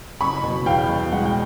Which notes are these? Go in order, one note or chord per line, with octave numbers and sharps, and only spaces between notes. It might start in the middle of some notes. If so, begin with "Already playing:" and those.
F#1 B5 C#6
B2
E2 F5 G5
B2
G#3 F#5
G5